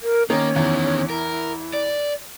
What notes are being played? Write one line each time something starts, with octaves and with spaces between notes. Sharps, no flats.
A#4
D#3 A#3 C#4
E2 D#3 B3
E4 A#4
D5